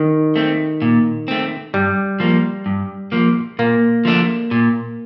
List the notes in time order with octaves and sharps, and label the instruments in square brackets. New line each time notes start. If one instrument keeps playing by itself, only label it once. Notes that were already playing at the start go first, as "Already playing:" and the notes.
Already playing: [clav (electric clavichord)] D#3
[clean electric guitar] A3 C4
A#2
A3 C4
[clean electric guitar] G2 [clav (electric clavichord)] G3
[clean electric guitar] F3 A#3
G2
F3 A#3
[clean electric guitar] A#2 [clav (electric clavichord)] A#3
[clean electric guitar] F3 A3 D4
A#2